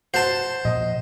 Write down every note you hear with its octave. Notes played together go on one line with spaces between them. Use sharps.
F#4 C5 A5
A#2 F3 A#3 D#5